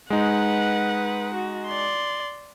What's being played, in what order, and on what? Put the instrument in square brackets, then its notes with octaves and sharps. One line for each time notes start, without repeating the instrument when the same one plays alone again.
[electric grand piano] G#3 D#4 [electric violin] B4 F#5
[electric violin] F#4
D5 C6